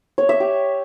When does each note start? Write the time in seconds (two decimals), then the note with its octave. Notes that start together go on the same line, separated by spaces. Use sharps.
0.18 C#5
0.29 E5
0.40 G4